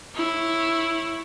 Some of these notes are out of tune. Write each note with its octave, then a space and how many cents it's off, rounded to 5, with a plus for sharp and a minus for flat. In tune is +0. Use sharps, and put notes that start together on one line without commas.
E4 +0 C#5 -15